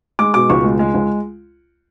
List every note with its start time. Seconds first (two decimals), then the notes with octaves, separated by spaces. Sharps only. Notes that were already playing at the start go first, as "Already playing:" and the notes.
0.19 G#3 D6
0.34 B2 D6
0.50 C#2 C#6
0.64 G#3
0.79 G#3
0.94 C#2